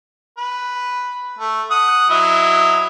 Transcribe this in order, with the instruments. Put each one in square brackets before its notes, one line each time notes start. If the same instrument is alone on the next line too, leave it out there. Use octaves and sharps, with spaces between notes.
[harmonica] B4
A3
F#5 D#6
F#3 E4 D#5